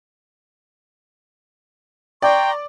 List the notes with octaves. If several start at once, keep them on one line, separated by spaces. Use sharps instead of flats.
D5 G5 A#5 C6 C#6